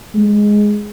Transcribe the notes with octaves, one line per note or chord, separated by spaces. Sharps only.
G#3